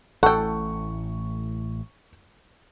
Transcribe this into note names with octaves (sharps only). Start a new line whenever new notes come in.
A1 A2 A4 F#5 G5 C#6